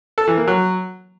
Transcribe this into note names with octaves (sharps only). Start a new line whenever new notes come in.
A4
E3
A#3
F#3